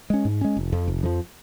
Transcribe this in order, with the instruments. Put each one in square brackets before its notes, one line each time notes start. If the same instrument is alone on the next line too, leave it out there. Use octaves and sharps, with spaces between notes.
[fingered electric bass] G#3 C#4
G#2
G#3 C#4
F1
F2 F3
F1
F2 F3